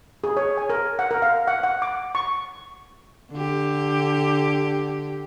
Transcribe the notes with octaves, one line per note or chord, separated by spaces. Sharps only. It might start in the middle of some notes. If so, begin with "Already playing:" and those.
G#4
C#5
G#5
A#4
F#5
A#4
F5
F#5
F#5
D6
C#6
D3 G4